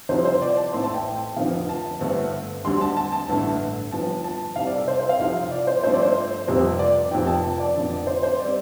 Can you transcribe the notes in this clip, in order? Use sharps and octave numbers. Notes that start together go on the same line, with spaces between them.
C2 C3 F3 C5
C5
D5
A5
A1 A2 A3 C4 C6
A5
G5
F1 F2 D3 F3 C4 F5
A5
G1 G2 D3 A3 C4
D2 D3 G3 C6
A5
A5
A5
A1 G2 D3 A3
G1 G2 F3 A5
A5
C2 C3 G3 C4 F5
D5
A4
C5
C5
F5
C2 C3 F3 F5
D5
C5
G2 F3 A3 C4 C5
D5
C5
F1 F2 C3 G3 C4
D5
F1 F2 C3 F3 G5
A5
A5
D5
F1 F2 D3
C5
C5
G3 C4 D5